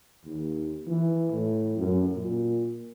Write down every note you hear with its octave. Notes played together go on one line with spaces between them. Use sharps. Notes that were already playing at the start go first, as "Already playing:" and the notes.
D#2
E3
A2
F#2
A#2